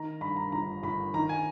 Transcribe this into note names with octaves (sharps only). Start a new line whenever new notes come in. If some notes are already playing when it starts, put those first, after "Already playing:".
Already playing: D#3 A#5
G2 B5
A#5
G1 A#5
G1 B5
D#3 A#5
G#5